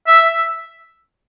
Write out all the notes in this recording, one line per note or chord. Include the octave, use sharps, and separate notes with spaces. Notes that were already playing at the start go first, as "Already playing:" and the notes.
E5